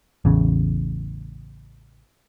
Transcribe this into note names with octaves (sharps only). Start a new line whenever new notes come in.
A1 E2 C#3